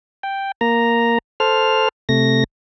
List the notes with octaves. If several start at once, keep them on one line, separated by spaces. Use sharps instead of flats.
G5
A#3 A#5
A4 C5 F6
C3 A3 A#6